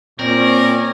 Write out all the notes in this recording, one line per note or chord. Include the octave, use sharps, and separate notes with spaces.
A#2 C4 C#4 A#4 C#5 D5